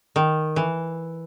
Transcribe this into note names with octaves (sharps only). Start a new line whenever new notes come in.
D#3
E3